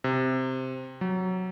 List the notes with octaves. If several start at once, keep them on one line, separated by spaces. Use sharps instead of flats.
C3
F#3